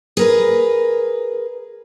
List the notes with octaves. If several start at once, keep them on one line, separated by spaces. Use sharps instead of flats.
G#4 A#4 B4